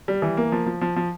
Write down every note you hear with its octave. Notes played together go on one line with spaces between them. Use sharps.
G3
E3
A#3
F3
F3
F3
F3